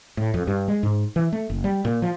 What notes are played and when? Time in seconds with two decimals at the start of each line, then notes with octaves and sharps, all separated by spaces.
0.17 A2
0.34 F2
0.47 G2
0.68 G#3
0.83 G#2
1.16 E3
1.33 A3
1.50 F#1
1.64 G3
1.85 A#2
2.02 F3